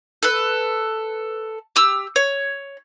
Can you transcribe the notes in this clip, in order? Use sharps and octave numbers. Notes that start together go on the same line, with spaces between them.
A4 B4
G4 E6
C#5